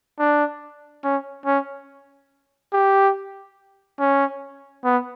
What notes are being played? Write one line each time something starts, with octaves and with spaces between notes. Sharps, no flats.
D4
C#4
C#4
G4
C#4
B3